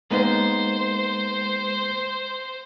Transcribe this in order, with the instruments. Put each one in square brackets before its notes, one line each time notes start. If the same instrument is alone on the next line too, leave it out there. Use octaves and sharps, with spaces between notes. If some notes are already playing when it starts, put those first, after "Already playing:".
[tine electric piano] G#3 [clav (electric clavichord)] A#3 B3 D#4 [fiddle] C5